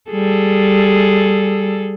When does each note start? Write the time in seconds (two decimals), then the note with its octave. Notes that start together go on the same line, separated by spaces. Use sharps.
0.11 G3 G#4 A4